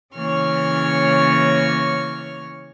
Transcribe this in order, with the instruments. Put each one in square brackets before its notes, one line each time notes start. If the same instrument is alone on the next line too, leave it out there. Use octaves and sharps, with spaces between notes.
[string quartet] C#3 E3 A#3 C#5 C#6 F6